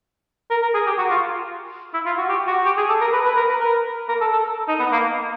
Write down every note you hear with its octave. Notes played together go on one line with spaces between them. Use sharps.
A#4
A#4
G#4
G4
F#4
F4
E4
F4
F#4
G4
F#4
G4
G#4
A4
A#4
B4
B4
A#4
B4
A#4
A#4
A4
A4
D#4
B3
A#3